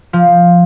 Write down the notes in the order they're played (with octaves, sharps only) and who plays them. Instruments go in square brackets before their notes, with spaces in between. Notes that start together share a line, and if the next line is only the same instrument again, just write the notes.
[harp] F3